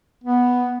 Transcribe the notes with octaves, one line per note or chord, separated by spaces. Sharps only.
B3